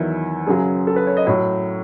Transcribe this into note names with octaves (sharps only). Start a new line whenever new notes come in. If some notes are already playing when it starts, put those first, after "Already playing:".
Already playing: E2 D#3 F#3 E4
F#2 C#3 F#3 G#4
A4
B4
C#5
D#5
A2 F#3 C#5